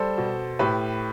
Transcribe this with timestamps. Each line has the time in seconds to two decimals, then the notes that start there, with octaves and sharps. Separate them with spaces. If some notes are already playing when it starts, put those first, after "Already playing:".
Already playing: G3 A4 C5
0.18 B2
0.59 A2 G4 B4